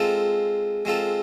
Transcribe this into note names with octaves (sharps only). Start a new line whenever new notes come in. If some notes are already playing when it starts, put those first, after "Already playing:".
Already playing: G#3 C4 F4 A4
G#3 C4 F4 A4